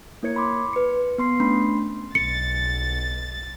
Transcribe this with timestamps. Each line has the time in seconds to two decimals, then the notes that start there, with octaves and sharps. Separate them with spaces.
0.23 A#3 E4 A#4 C#5 G#6 C#7
0.36 B5 C6 D6
0.73 B4 C#7
1.18 B3 C6 C7
1.40 A3 C#4 D4 B5 C6
2.15 B1 A6 C#7